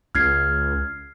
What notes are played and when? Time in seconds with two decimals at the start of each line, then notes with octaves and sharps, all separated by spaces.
0.15 C#2 F6 G#6 C7